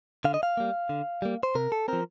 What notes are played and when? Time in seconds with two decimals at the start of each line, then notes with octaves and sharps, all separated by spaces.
0.25 D3 F5
0.34 D#5
0.43 F5
0.57 G3 A#3
0.89 D3
1.22 G3 A#3
1.43 C5
1.55 C3 A#4
1.72 A4
1.88 F3 C4 A#4